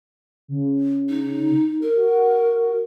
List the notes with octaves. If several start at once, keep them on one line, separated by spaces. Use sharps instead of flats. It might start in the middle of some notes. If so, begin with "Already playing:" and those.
C#3
D#4
A#4
F#4